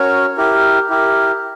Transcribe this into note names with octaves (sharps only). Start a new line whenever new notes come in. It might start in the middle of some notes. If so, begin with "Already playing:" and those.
Already playing: C#4 F#4 A#4 C#5
E4 G4 A#4
E4 G4 A#4